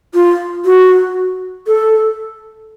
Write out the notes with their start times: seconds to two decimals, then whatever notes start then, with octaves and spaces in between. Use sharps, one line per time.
0.14 F4
0.65 F#4
1.67 A4